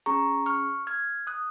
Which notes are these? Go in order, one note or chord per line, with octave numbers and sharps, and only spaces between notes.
C#4 G#4 A#5 C#6
C#6 F6
F6 G#6
D#6 F#6